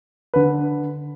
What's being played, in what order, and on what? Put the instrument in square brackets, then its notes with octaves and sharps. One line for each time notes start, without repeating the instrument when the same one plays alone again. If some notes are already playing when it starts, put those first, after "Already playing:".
[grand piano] D3 B4